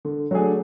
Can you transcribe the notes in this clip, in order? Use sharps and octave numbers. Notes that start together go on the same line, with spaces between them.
D3
F#3 A3 D4 G#4